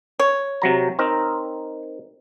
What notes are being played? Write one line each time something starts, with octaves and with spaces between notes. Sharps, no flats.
C#5
C3 F#3 A#5
C4 D#4 A#4